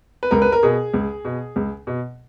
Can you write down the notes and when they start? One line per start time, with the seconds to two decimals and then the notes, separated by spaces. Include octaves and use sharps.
0.23 B4
0.31 C#2 A#4
0.42 B4
0.52 A#4
0.63 B2 G#4
0.94 C#2
1.25 B2
1.56 C#2
1.87 B2